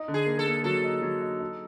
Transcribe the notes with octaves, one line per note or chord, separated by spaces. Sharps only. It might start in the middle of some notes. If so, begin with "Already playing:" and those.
Already playing: D#4
D3
G#4
A#3
A4
A#3
F#3 A4
D#4
F#3
D#4
D#4